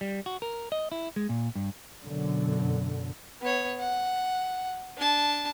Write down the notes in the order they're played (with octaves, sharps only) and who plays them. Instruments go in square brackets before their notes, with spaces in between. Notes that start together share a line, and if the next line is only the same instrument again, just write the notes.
[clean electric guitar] G3
F#4
A#4
D#5
E4
G#3
A#2
G2
[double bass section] F#2 B2 D3
[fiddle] B3 C#5
F#5
D4 A5